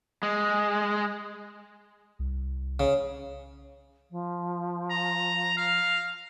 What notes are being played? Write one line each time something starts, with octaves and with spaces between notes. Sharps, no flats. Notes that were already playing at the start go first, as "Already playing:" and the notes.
G#3
C2
C#3
F3
A#5
F5